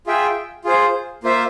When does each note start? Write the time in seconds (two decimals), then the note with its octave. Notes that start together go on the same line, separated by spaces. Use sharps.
0.07 F4 G#4 E5 G5
0.64 F4 G#4 C5
1.23 A#3 F4 C5 E5